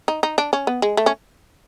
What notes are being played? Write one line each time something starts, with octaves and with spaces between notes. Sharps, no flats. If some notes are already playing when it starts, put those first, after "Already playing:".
D#4
D#4
D4
C#4
B3
G#3
A3
C#4